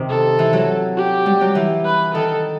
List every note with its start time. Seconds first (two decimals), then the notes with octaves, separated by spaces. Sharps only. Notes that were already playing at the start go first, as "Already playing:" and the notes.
Already playing: C3 D#3
0.09 A4
0.39 E3
0.53 F#3
0.97 G4
1.26 G3
1.41 F#3
1.55 E3
1.85 B4
2.14 D#3 A4